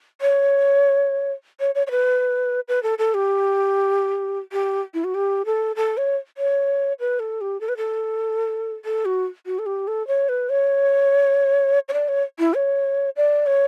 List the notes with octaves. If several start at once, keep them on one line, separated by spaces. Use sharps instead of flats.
C#5
C#5
C#5
C#5
B4
B4
A4
A4
G4
G4
E4
F#4
G4
A4
A4
C#5
C#5
B4
A4
G4
A4
B4
A4
A4
F#4
F#4
A4
G4
A4
C#5
B4
C#5
C#5
D5
C#5
E4
C#5
D5
C#5